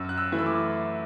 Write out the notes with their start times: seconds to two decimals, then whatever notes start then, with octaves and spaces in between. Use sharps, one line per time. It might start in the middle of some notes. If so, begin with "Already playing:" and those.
Already playing: F#2 E6
0.09 F#6
0.17 E6
0.32 E3 A3 E4
0.39 E6
0.46 D6